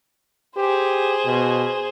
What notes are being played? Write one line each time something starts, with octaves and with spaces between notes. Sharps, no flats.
G4 G#4 C5
B2